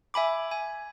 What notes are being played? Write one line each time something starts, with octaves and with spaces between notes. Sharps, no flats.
E5 G#5 B5 D6
G#5